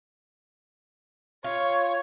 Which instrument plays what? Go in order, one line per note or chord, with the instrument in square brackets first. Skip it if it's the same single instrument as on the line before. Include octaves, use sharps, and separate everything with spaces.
[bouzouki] F4 [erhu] C#5